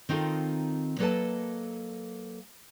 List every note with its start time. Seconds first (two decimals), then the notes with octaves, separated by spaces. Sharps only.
0.09 D#3 C4 D#4 F4 A4
0.99 F#3 A#3 A4 B4 D#5 A5